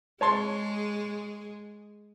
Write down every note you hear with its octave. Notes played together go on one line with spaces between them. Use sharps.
G#3 G#4 C#5 A5 C6